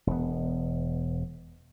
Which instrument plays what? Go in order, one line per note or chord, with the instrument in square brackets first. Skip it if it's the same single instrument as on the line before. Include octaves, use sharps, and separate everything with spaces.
[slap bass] E1 B3